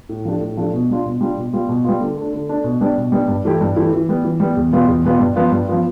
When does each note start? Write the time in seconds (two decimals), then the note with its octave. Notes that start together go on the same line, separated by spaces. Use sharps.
0.09 A2
0.25 F3 A3 D4 G4
0.41 A2
0.57 F3 A3 D4 G4
0.74 B2
0.90 G3 D4 F4
1.05 B2
1.21 G3 D4 F4
1.37 B2
1.53 G3 B3 F4
1.69 B2
1.84 G3 B3 F4
2.00 D3
2.17 A3 D4
2.33 D3
2.49 A3 D4
2.64 B2
2.81 G3 B3 D4
2.97 B2
3.12 G3 B3 D4
3.28 G2
3.45 E3 A3 E4 G4
3.61 G2
3.76 E3 A3 E4 G4
3.92 E3
4.09 G3 B3
4.25 E3
4.40 G3 B3
4.57 E2
4.72 B2 G3 B3 F4
4.88 E2
5.05 B2 G3 B3 F4
5.20 G2
5.35 F3 B3 F4
5.51 G2
5.68 F3 B3 F4